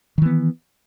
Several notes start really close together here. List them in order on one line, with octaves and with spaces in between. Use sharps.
D#3 E3 B3